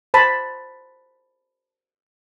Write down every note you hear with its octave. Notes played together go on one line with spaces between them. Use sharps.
C5 A5 B5